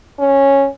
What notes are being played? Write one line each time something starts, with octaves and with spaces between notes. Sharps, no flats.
C#4